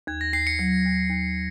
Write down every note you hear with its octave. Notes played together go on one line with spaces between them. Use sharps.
D#2 G#6
A#6
D#2 C7
C#7
F#3
D#2
D#2